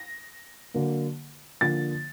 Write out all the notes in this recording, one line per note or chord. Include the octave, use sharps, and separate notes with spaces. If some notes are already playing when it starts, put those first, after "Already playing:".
Already playing: A#6
D3 F#3 A#3
D3 F3 A#3 A6